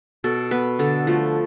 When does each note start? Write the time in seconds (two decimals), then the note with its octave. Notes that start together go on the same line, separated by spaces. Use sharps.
0.24 B2 A4
0.51 B3 B4
0.79 D3 A4
1.07 F3 A3